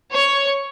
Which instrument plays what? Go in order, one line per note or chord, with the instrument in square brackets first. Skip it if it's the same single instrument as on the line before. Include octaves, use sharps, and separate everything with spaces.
[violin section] C#5